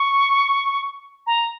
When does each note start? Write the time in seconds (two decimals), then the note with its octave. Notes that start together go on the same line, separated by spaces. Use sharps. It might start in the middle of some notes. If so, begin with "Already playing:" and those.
Already playing: C#6
1.27 A#5